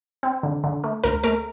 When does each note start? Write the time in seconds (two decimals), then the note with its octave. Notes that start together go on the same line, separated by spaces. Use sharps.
0.23 C4
0.43 D3
0.64 D3
0.84 A3
1.04 D2 A#4
1.24 A3 A#4